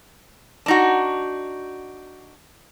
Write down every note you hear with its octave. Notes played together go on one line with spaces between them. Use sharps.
D4 D#4 F#4